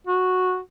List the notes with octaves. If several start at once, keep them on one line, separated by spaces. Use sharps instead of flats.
F#4